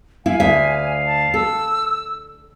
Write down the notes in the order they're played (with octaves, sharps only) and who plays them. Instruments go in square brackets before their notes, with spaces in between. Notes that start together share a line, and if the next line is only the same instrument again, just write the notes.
[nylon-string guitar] E4 [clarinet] F5 [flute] G#5
[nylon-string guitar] D2 E5
[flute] A5
[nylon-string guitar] A4 [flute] E6